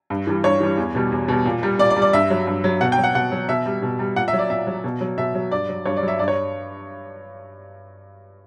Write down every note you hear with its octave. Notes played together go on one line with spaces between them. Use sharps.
G2
E3 G3
G2 C#5
E3 G3
E2
B2 G3
E2
B2 G3
A#2
G3
A#2 D5
D5
G3
D5
G2 E5
F#3
G2
F#3
B2 F#5
G5
F#3
F#5
B2 F#5
F#3
B2 E5
G3
B2
G3
A#2 F#5
E5
F#3
D5
A#2 E5
F#3
B2
F#3
B2 E5
F#3
G2 D5
F#3
G2 C#5
D5
F#3
E5
G2 D5
C#5